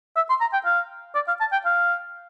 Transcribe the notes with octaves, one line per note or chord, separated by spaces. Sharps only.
E5
C6
A#5
G5
F5
D5
F5
A5
G5
F5